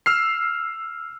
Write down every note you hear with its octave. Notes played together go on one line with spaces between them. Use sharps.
E6 F6 C7